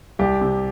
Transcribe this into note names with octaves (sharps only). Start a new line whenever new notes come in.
C2 G4
C3